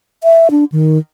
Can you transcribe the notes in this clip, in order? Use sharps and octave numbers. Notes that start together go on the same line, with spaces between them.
E5
D4
D#3